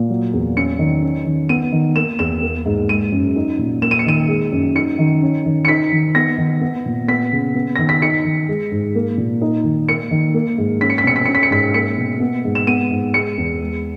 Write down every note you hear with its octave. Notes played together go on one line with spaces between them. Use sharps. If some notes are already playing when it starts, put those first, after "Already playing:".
Already playing: A#2 A#3
F#3
E2
C#4 C#7
D#3
C#4
D#3
B3 D#7
D#3
A#3 E7
E2 E7
A#3
G#2
G#3 D#7
F#2
D#4
A#2
A#3 E7
D#7
C#7
D#3 D#7
G#3
F#2
D#4 C#7
D#3
C#4
D#3
C#7
D#4 B6
D#3
B3 A#6
D#3
B3
A#2
B3 B6
C#3
B3
D#3 A#6
B6
D#4 C#7
D#3
G#3
G#2
A#3
A#2
D#4
D#3
A#3 C#7
D#3
A#3
G#2
C#4 B6
C#7
B6
B2 C#7
B6
C#4 C#7
B6
C#7
G#2 B6
A#3 C#7
B2
B3
G#2
E7
B3 D#7
G#2
G#3 C#7
E2
G#3